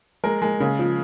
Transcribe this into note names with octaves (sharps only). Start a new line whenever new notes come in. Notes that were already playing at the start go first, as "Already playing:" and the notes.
G#3 A#4
G#3
C#3
F3